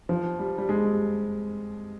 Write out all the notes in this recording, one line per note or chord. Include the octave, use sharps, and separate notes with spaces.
F3
G3
G3
G#3